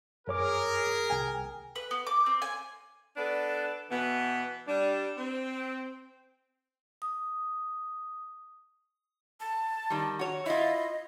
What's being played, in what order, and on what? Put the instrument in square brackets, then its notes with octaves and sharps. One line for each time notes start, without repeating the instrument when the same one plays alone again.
[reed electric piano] F#2 C#5 D6 [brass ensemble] G#4 A#4
[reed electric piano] C2 G5 G#5
[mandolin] B4
B3
D6
C4
G#5
[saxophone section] B3 D4 A4 B4
B2 E3 B3
G3 D4
C4
[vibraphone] D#6
[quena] A5
[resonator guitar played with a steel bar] D#3 G3
F#4 C#5
[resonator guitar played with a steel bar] E4 F4 [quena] D#5